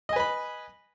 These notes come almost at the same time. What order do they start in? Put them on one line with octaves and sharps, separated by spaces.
D#5 G#5 B4 B5